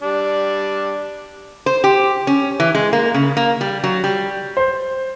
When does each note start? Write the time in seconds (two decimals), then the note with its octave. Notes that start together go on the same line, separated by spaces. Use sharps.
0.02 G3 D4
1.66 C5
1.84 G4
2.27 C#4
2.60 E3
2.75 G#3
2.93 A#3
3.14 C#3
3.37 A#3
3.61 G3
3.84 F#3
4.04 G3
4.57 C5